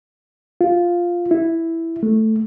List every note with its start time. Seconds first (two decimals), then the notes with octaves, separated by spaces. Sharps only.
0.61 F4
1.31 E4
2.03 A3